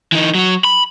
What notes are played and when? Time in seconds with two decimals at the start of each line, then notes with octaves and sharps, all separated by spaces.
0.12 E3 D#4
0.35 F#3 F#4
0.64 B5